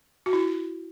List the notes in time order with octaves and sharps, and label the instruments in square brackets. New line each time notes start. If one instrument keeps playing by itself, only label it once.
[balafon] F#4
E4